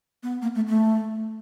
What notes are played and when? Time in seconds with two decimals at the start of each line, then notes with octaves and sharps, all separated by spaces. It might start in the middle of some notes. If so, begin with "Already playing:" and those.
0.23 B3
0.42 A#3
0.55 A3
0.68 A3